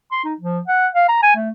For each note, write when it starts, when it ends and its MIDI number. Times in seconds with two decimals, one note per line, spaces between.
0.12 0.24 84
0.24 0.34 63
0.40 0.60 53
0.68 0.87 78
0.94 1.06 77
1.08 1.22 82
1.23 1.35 80
1.36 1.50 57